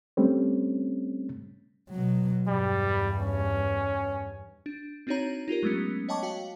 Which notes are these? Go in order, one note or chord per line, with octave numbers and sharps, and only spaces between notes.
G3 A3 C4 C#4
B2 F#3
E2 G2 G3
C#4
D4
C4 D4 D#4 F#4 C#5 A#5
D#4 F4 G4 A#4
F#3 G#3 A3 B3 C#4
C#5 D#5 G5 A5 C#6 D6
F#4 F5 G5